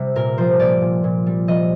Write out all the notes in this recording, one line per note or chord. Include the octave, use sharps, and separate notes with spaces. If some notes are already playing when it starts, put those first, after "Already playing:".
Already playing: C3 G3
A#2 A#4
F3 C5
A#2 D5
A#2
A#2
G3
F3 D#5